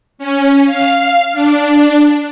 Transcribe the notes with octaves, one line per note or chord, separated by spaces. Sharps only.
C#4
F5
D4